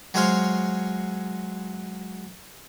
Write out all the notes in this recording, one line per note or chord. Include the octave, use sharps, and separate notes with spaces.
F#3 G#3 C5 C#5 F5 C6